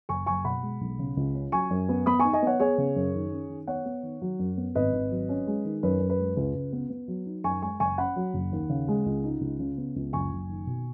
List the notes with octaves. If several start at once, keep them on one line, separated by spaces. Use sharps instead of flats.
F#1 G#5 C#6
F#1 G#5 C#6
B2 F#5 B5
G#3
B1
C#3
C#2
C#4
F#3 G#5 C#6
F#2
B3
B3 B5 D#6
D#4 G#5 C#6
D#5 G#5
B3 C#5 F#5
B3 G#4 C#5
C#3
F#2
D#3
C#4
D#3
B3 C#5 F#5
B3
D#3
F#3
F#2
B3
G#1 B4 D#5
G#1
F#3
C#4
G#3
D#3
F#2 B4
F#2
B4
G#3
C#2 B4
C#2
B3
B3
F#3
D#4
F#2 G#5 C#6
G#3 G#5 C#6
F#1 G#5 C#6
C#4 F#5 B5
F#3
F#1
D#2
C#3
G#3
C#2
D#4
C#2
C#3
B3
C#2
F#1 G#5 C#6
F#1
D#3
B2